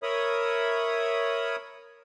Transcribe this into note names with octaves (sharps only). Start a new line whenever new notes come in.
A#4 C#5 E5 B5 D#6